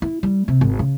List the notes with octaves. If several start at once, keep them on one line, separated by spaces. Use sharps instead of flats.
E4
G3
C3
G#1
C#3